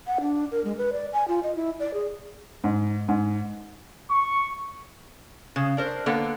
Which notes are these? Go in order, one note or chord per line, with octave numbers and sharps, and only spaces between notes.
F#5
D4
A#4
G#3
B4
D5
G#5
F4
D#5
E4
D5
G#4
G#2
G#2
C#6
C#3
D4 A#4 C5
D3 A#3 B3 A4